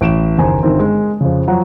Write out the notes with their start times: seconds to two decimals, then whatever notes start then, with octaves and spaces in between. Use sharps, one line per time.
0.01 A1 D7 E7
0.38 F#1 D#2 C5 G#5 A#5
0.63 G1 D3 D#3 C4
0.79 G#3
1.21 F2 C#3
1.48 F3 F#3 F#5 A#5